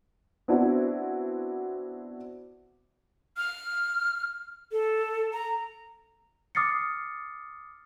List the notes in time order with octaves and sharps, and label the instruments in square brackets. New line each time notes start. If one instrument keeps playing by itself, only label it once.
[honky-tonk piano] B3 C4 D4 E4 F#4
[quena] F6
A4
A#5
[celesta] D6 D#6 F6 A6 C7 C#7